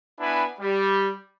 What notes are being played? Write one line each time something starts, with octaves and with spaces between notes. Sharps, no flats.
B3 D4 E4 B4 G#5
G3